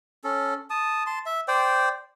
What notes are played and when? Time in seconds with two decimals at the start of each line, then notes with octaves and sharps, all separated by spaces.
0.24 C#4 A4
0.70 A5 D#6
1.07 A5 C6
1.26 E5
1.48 C5 D5 G5